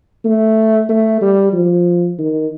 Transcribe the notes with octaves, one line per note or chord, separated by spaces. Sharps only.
A3
A3
G3
F3
D#3